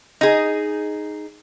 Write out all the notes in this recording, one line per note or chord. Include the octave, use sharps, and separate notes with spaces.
D#4 G#4